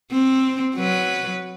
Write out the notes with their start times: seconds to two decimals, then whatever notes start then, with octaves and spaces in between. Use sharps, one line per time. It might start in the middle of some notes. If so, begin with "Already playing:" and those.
0.11 C4
0.76 F#3 B4